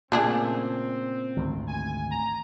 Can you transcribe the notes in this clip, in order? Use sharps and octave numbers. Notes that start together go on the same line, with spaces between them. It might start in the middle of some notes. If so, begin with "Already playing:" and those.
A#2 C#3 A3 C4 D4 G#4
G#1 D2
G#5
A#5